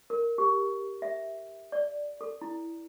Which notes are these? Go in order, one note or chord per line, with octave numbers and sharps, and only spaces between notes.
A#4
G4
E5
D5
A4
E4